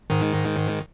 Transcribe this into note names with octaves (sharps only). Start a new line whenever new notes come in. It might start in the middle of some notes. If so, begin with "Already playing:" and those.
G#2 D#3